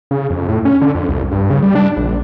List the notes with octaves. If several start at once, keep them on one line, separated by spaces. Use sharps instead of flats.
C#3
F2
A2
C#4
D3
F2
C2
G2
C#3
G3
D4
A#1